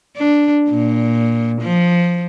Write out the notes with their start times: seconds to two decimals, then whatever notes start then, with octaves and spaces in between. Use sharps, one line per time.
0.16 D4
0.70 A#2
1.62 F3